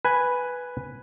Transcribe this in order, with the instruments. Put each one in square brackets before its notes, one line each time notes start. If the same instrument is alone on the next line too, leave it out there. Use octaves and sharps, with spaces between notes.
[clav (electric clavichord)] B4 G#5